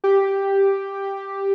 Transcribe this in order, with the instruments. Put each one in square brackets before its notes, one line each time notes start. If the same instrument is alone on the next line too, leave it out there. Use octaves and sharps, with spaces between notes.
[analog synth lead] G4